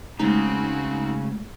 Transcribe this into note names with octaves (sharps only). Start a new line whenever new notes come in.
C#3 G#3 A3 C4 D#4 F#4